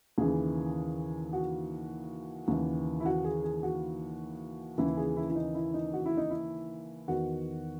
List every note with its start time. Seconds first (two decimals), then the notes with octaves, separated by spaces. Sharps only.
0.18 D#2 C#3 E3 G#4
1.33 F#4
2.48 D#2 C#3 E3
3.00 E4
3.05 F#4
3.24 G#4
3.44 G#4
3.63 F#4
4.78 D#2 C#3 E3 E4
4.97 G#4
5.16 E4
5.30 E4
5.36 D#4
5.55 E4
5.74 D#4
5.93 F#4
6.06 E4
6.17 D#4
6.30 E4
7.08 E2 D#3 F#4